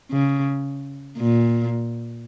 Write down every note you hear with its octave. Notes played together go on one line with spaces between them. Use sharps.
C#3
A#2